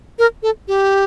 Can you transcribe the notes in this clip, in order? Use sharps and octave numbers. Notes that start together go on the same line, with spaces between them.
A#4
A4
G4